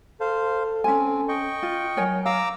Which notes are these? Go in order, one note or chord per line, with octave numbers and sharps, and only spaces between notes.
A4 C5 F5
C4 C#4 G#5
D#5 G5 C#6
F4
F#3 A#4 C#5 G#5
F5 A#5 D6 E6